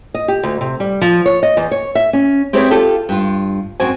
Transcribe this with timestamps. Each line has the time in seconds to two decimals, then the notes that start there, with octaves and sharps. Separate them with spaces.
0.14 D#5
0.28 G4
0.43 D2
0.61 C3
0.80 G3
1.01 F3
1.26 C#5
1.43 D#5
1.57 E2
1.71 C#5
1.95 E5
2.13 C#4
2.53 C4 E4 G4 G#4 B4 C#5
2.71 F4 G4 A4
3.09 G2 F4
3.80 F#2 C4 F#4 G#5